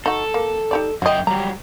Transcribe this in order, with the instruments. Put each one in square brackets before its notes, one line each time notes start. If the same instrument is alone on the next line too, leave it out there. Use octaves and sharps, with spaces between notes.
[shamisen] D#4 F#4 [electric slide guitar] A4
[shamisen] A#3
D#4 G4 D5
[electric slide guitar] F#2 G5 [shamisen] F#4 D#5
[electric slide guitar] F#3 G3 [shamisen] A#5